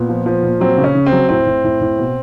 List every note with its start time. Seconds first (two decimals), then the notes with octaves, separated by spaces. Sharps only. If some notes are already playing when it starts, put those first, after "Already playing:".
Already playing: A#2 B3
0.09 F3
0.26 F3
0.43 A#2
0.60 F#3 C4
0.78 C#3
0.84 C#4
0.95 C#3
1.06 C4
1.12 F#3
1.29 A2 C4
1.47 A2
1.64 A2
1.81 A2
1.99 B2